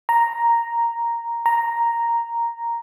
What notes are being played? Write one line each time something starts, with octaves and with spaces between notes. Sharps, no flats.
A#5
A#5